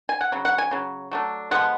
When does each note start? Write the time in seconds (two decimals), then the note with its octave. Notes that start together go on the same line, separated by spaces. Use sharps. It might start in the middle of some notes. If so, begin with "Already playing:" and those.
0.09 G#5
0.21 F#5
0.32 C#3 F#3
0.45 F#5
0.58 G#5
0.71 C#3 F#3
1.11 F#3 A3 D4
1.51 D3 F3 G#3 B3 F#5